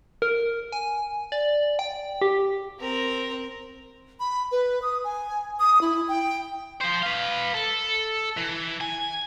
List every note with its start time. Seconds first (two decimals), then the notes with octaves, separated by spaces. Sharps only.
0.22 A#4
0.72 G#5
1.32 D5
1.79 G5
2.21 G4
2.79 C4 A#4
4.20 B5
4.52 B4
4.82 D#6
5.04 G#5
5.59 D#6
5.81 E4
6.08 G5
6.81 F3 C5
7.03 B4 F5
7.54 A4
8.37 E3
8.81 G#5